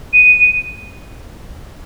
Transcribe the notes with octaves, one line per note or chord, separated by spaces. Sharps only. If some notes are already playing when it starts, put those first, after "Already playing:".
D#7